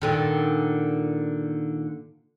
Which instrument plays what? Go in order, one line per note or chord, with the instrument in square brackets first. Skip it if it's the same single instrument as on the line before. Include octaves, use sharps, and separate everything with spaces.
[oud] A#2 D3 D#3